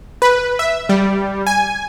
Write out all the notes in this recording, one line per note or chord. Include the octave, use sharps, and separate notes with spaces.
B4
E5
G3
G#5